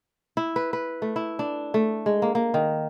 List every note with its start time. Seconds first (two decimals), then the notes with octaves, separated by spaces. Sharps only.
0.37 E4
0.56 B4
0.73 B4
1.02 A3
1.16 E4
1.39 D4
1.74 A3
2.06 G#3
2.22 A#3
2.35 A#3
2.54 D#3